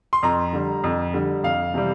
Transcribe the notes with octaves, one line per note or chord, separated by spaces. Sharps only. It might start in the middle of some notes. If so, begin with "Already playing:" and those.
C6
F2 A#5
D3 G3
F2
D3 G3
F2 F5
C3 E3 G3